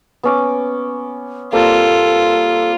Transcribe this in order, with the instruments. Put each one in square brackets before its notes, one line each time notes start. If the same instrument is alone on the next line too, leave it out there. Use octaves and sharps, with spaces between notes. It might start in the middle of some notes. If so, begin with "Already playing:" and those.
[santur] B3 C#4 D6
[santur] G3 A#3 C4 [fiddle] F4 [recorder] A4